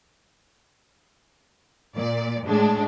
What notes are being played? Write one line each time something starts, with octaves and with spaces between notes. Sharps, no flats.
A#2 D5
A2 G#3 D4